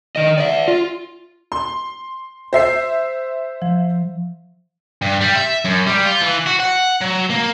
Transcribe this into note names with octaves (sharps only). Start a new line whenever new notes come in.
D#3 D#5
D5 E5
F4
C6
C5 E5 C7
F3
G2
G3
E5
F#2
G3
F4
E3
F#4
F#5
F#3
A#3